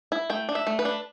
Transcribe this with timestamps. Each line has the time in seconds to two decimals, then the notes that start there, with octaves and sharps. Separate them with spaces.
0.12 E4
0.30 A3 G5
0.49 D4
0.55 E5
0.67 A3
0.79 B4
0.85 D4